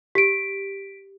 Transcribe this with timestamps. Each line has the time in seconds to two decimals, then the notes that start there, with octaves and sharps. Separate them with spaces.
0.15 G4 B6 D7